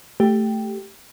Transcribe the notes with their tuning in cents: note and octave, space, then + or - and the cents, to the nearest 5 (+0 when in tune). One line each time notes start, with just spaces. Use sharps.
A3 +0 G4 +0